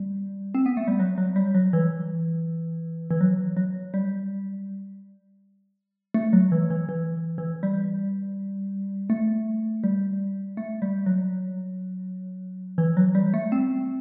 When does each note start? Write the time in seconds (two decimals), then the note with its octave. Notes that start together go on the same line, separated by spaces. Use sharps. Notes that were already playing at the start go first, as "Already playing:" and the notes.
Already playing: G3
0.55 C4
0.66 B3
0.77 A3
0.88 G3
1.00 F#3
1.18 F#3
1.36 G3
1.55 F#3
1.73 E3
3.11 E3
3.21 F#3
3.57 F#3
3.94 G3
6.14 A3
6.33 F#3
6.52 E3
6.70 E3
6.89 E3
7.38 E3
7.63 G3
9.10 A3
9.84 G3
10.57 A3
10.82 G3
11.06 F#3
12.78 E3
12.97 F#3
13.15 G3
13.34 A3
13.52 C4